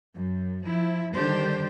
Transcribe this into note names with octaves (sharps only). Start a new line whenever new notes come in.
F#2
F3 E4
D3 D#3 G3 D4 G4 C5